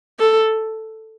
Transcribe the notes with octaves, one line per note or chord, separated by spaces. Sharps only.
A4